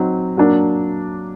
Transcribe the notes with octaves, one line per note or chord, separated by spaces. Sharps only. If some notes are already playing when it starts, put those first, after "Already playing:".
Already playing: F#3 C4 D#4
F#3 A#3 D4